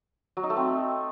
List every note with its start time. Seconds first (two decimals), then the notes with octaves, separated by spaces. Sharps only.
0.37 F#3
0.43 D#4
0.50 A3
0.56 C4